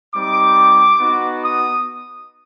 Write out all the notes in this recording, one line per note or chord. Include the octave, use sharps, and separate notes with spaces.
G3 C4 D#4 D6
B3 D#4 F#4
D#6